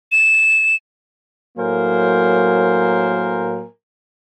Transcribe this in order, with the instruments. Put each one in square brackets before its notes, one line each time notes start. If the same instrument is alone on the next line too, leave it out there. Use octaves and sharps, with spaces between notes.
[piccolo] E7
[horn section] A2 F#3 A#3 A#4 C5 G#5